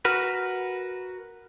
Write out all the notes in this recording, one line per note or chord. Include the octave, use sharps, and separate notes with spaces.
F#4 A#4 B4 F6